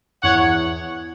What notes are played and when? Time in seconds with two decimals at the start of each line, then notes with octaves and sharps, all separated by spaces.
0.23 E2 C#5 F#5